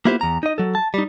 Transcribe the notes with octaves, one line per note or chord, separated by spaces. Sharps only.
A#3 B3 E4 F4 G4 C5
E2 A#5
D#4 D#5
F#3 A4
A5
G3 D#4